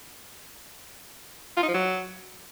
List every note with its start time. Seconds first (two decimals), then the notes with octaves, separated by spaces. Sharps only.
1.57 F4
1.63 D#4
1.68 F3
1.74 F#3